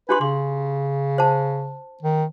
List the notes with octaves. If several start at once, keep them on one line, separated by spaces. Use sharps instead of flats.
D4 G4 B4 C6
C#3 C6
C5 A5
D#3